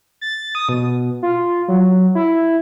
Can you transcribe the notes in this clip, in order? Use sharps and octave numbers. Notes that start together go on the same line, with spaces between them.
A6
D#6
B2
F4
F#3
E4